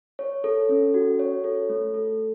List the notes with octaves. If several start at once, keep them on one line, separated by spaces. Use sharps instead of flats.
C#5
A4
C#4
F#4
C#5
A4
A3
A4